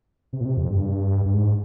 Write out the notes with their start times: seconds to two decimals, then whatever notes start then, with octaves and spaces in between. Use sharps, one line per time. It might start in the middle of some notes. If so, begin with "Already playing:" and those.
0.33 C3
0.41 A#2
0.45 C3
0.57 F2
0.70 G2
1.26 G2
1.34 G#2